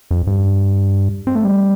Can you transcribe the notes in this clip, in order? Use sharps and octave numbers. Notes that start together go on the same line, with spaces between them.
F2
G2
C4
A3
G3